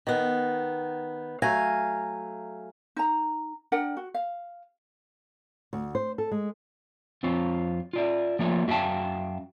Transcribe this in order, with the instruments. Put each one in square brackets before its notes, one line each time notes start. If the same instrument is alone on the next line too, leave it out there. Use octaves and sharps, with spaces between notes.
[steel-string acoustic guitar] D#3 B3
F#3 A3 F5 G#5 A#5
[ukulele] D#4 A#5
D4 A#4 F#5 G5
F#4
F5
[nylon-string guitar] D2
C5
A4
G#3
[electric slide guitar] F2 C4 F4 C#5
F4 D5 E5
F3 A3 A#3 F4 C#5 E5
F#2 F#4 E5 F5 G5 A5